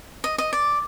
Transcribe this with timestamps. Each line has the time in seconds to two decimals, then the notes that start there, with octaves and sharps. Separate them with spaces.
0.24 D#5
0.38 D#5
0.53 D5